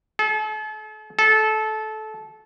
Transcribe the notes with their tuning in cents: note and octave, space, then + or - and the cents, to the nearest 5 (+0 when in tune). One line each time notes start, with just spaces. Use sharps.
A4 -40
A4 -20